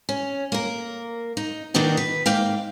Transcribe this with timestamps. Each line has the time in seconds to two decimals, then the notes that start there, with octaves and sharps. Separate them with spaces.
0.09 C#4
0.52 A#3 A#4
1.37 D#4
1.74 B2 D#3 A#3 D4 D#4 F#4
1.97 B4
2.26 G#2 A#3 F5 G5